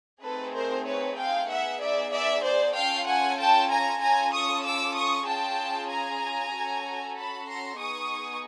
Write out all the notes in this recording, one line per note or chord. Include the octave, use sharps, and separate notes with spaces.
A3 C4 D#4 G#4 A4 B4
A#4 C5
B4 C#5
F5 G5
B3 D#4 G#4 E5 F#5
D5 E5
D5 E5
C5 D5
C#4 F4 A4 F5 G5
F#5 G#5
G5 A5
G#5 A#5
C#4 F4 A4 G#5 A#5
C#6 D#6
D6 E6
C#6 D#6
C#4 F4 G#4 G5 A5
G#5 A#5
C#4 F#4 A4
A5 B5
A#5 C6
B3 D#4 G#4 C#6 D#6